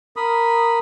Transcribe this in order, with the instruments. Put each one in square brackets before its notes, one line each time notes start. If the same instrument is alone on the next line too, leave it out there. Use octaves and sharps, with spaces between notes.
[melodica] A#4 B5 D#6